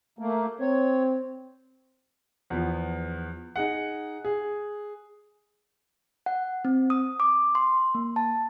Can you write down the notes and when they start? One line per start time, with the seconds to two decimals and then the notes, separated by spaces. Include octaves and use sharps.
0.19 A3 A#3
0.60 C4 C#5
2.50 E2 F3 B3
3.56 D#4 G#4 F#5
4.25 G#4
6.26 F#5
6.65 C4
6.90 D#6
7.20 D6
7.55 C6
7.95 A#3
8.16 A5